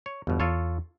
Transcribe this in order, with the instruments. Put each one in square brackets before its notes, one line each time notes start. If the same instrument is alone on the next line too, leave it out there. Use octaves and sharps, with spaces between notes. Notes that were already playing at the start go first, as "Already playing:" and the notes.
[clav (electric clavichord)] C#5
[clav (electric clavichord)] G1 B2 [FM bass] E2
[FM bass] E2 [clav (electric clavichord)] F4 A4 C#5